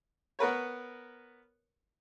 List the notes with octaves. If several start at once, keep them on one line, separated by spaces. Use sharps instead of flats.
B3 A#4 B4 C#5